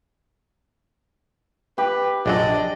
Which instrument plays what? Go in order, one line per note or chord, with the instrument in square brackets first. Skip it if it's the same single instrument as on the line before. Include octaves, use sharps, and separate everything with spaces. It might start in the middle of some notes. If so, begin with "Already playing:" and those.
[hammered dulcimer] G4 [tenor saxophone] B4
[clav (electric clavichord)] A#1 F#2 F#3 [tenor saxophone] D4 [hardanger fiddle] D5 D#5